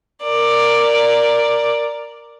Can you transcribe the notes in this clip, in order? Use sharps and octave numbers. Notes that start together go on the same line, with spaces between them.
A#4 D5